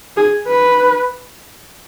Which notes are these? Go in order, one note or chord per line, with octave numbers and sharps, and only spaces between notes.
G#4
B4